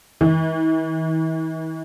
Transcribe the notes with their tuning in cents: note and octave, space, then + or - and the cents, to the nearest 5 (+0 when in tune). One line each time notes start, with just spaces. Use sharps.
E3 -45